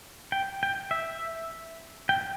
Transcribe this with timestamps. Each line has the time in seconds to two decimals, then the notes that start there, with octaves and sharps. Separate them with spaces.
0.32 G5
0.63 G5
0.91 E5
2.09 G5